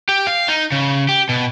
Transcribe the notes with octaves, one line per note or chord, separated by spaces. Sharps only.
G4
F5
D#4
C#3
G4
B2